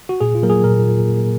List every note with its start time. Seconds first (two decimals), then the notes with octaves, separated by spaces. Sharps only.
0.09 F#4
0.21 A#2 G#4
0.35 F4
0.43 F#3 A#3 A#4
0.50 G#4
0.64 A#2 A#4